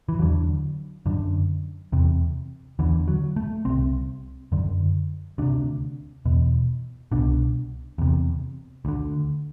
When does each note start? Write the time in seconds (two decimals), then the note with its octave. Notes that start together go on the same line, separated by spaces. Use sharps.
0.09 E3
0.19 E2 D3 F#3
1.06 F#2 D3
1.92 E2 C3
2.79 E2 D3 E3
3.08 F#3
3.36 A3
3.65 C2 C3 C4
4.52 F#2 D3
5.38 D2 C3 D4
6.26 E2 B2
7.12 C2 B2 D4
7.98 E2 C3
8.85 D2 D3